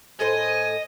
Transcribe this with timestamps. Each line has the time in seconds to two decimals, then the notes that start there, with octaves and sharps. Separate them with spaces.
0.20 A2 A4 C5 D#5 G#5